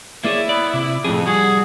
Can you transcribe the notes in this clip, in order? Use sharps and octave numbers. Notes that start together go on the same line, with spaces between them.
A#3 E4 G#4 C#5 D5
B3 D5
C3 D6
F2 A2 G#4
G3 F#4 G#4